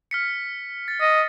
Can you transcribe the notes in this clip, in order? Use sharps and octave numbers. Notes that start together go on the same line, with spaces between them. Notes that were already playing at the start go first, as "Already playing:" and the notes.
F6 B6 C#7
A6
D#5